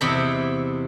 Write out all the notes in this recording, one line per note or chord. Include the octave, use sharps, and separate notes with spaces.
E2 C3 E4 D#5 B5